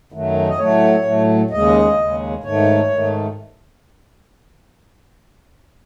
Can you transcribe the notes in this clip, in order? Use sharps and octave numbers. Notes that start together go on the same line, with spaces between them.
F#2 D#3 F#3 A3
D#5
A2 F#3 A3 C#5
A2 F#3 A3
D#2 C#3 G#3 D#5
D#2 C#3 G#3
G#2 D#3 A3 C#5
G#2 D#3 A3